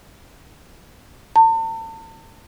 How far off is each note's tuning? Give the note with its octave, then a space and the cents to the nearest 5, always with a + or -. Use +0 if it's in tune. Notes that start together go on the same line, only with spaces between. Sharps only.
A5 +40